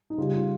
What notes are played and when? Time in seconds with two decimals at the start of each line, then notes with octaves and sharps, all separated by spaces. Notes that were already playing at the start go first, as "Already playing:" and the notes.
0.10 D#4
0.18 C#3 G3 F4
0.34 F4